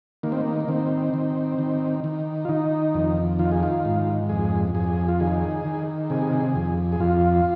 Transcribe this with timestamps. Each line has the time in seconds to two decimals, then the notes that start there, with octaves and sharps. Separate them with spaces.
0.23 D#3 A#3
0.32 C4
0.41 A#3
0.60 A#3
0.69 D#3 C4
1.14 D#3
1.59 D#3
2.04 D#3
2.45 F4
2.49 D#3 D#4
2.94 F2
3.39 D#3 F4
3.51 G#4
3.63 F4
3.85 G#2
4.29 F2 G#4
4.75 F2 G#4
5.08 F4
5.20 D#3 G#4
5.65 D#3
6.10 C3 G#4
6.55 F2
6.92 G#4
7.00 F2 F4